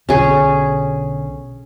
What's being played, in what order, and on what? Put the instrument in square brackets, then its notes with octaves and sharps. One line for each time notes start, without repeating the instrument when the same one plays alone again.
[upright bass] B1 D3 [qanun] C#4 G#4